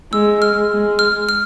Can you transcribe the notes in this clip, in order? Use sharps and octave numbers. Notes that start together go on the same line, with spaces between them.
G#3 E6
F6
G#3
F6
F6